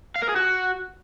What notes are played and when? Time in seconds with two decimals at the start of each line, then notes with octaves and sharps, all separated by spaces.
0.16 F5
0.22 A#4
0.29 G#4
0.36 F#4